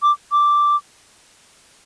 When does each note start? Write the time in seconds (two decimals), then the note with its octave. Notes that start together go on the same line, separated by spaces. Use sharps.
0.03 D6
0.32 D6